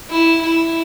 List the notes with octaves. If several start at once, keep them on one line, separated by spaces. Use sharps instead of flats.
E4
E4